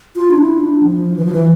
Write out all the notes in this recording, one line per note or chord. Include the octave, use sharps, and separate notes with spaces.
F4
D4
E4
D4
F3
E3
F3
E3